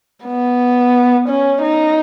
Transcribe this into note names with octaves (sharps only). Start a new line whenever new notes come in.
B3
C#4
D#4